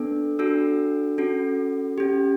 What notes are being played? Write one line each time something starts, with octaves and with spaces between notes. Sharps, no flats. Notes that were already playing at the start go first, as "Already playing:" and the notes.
Already playing: B3 D4 A4
D4 F#4 A4 E6
C#4 F#4 A4
C#4 G4